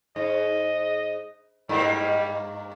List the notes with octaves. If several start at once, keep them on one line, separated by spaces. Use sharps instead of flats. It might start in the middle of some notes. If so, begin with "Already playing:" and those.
G#2 D#5
G2 G3 A#3